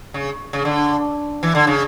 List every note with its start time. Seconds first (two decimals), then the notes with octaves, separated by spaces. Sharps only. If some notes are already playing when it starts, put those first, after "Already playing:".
0.14 C#3
0.53 C#3
0.65 D3
1.43 E3
1.55 D3
1.67 C#3